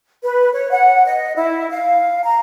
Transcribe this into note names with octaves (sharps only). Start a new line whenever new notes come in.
B4
C#5
F#5
D#5
E4
F5
A#5